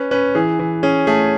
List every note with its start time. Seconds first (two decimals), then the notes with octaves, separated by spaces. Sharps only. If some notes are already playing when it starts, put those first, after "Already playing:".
Already playing: C#4 B4
0.11 C#4 B4
0.35 E3 G#4
0.59 E3
0.83 C#4 G#4
1.07 A3 G#4